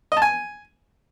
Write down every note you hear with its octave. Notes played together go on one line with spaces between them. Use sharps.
D#5
A5
G#5